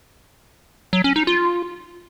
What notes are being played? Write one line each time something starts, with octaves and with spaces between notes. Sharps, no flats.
F#3
C#4
D#4
F4